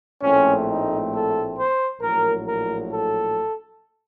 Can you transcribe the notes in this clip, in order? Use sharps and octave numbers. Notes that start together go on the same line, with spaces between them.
A#1 A2 A3 C4 C#4
D#4
A4
C5
A#1 A2 F#3 A#4
A#4
A4